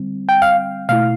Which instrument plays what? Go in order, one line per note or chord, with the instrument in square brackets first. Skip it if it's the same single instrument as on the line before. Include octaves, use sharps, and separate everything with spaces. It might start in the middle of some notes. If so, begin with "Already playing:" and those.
Already playing: [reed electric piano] D3 G3 C4
[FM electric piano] G5
F5
[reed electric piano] B2 A3 E4 [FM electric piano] F5